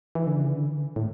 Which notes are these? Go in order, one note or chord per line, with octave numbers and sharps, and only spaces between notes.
E3
D3
C#3
D3
A2